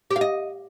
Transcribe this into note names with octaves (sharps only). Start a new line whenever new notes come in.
G4
F5
D#5